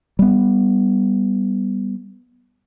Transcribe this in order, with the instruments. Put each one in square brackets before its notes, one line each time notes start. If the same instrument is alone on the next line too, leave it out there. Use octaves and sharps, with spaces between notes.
[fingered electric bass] G3 B3